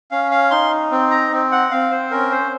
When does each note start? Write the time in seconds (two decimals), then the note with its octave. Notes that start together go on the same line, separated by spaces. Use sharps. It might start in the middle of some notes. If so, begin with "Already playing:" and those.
0.11 C#4 F5
0.31 F5
0.51 D#4 C6
0.91 C4
1.11 A#5
1.32 C4
1.52 F#5
1.71 C4 F5
1.91 C5
2.11 C#4 A#4
2.31 C5